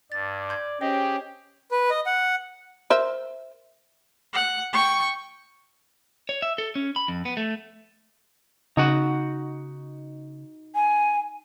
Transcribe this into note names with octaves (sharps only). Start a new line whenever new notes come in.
G2 D5 A6
C6 G6 G#6
C#4 G4 G#4 C5 D#5 G5
B4
D#5
F#5
A#4 C5 E5
F#5
G5 C#6
C#5
E5
A4
C#4
B5
F2
B3
A3
C#3 D#4 F#4 F#5
G#5